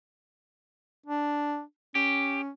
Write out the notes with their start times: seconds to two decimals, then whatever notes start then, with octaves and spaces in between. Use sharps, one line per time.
1.06 D4
1.95 C#4 G4